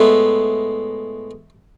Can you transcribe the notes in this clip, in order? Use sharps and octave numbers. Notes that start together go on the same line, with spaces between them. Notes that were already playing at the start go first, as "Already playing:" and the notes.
Already playing: A2 G#3 B3 E5